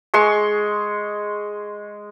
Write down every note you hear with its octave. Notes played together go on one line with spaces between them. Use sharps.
G#3 C6 C#6